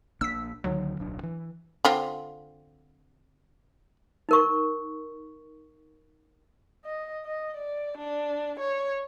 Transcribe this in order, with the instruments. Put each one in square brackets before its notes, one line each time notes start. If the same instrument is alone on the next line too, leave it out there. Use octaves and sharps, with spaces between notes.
[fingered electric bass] A#1 A#3 D4 [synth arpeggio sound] E6 B6
[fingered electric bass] C#2 D3 D#3 [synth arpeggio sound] F#3
[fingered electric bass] D1 B1 D4
E3
[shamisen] D3 C4 F4
[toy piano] D#4 A#4 C#6
[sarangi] D#5
D#5
D5
D4
C#5